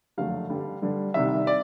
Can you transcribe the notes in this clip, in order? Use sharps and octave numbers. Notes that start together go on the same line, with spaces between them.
F#1 F2 D3 F#3 A3 F5
G2 D3 G3
G2 D3 G3
C2 C3 D#3 G3 E5
D5